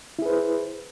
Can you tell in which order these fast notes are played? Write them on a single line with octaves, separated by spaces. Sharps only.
E4 G#4 B4 C5